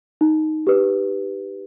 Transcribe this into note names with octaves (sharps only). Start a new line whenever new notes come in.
D#4
G4 B4